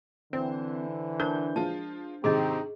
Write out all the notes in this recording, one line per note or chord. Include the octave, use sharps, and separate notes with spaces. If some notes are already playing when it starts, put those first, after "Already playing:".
D3 E3 C4 C5
D4 A#4 C5 A#5 G6
F3 G#3 F4 A5
G#2 C3 D#3 C4 D#4 G4 G#4 D#5